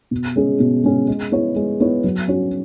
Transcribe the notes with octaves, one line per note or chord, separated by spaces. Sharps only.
B2
G#3 C#4 G#4
B2
G#3 C#4 G#4
G#3
B3 E4 C#5
G#3
B3 E4 C#5
F#3
C#4 F#4 C#5